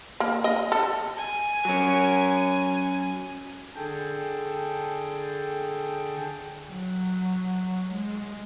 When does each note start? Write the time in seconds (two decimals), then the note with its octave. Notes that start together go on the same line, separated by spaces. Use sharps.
0.20 A#3
0.44 D#5
0.72 A4
1.17 G#5
1.65 F#3 C#4
3.75 D3 G#4 A4 G5
6.69 F#3
7.91 G#3